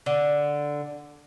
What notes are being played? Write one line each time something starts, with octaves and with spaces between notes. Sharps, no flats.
D3